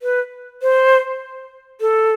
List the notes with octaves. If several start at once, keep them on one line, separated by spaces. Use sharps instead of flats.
B4
C5
A4